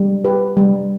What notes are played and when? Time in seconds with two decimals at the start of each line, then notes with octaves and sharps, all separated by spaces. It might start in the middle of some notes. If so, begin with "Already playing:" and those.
Already playing: G3
0.24 G4 B4
0.57 G3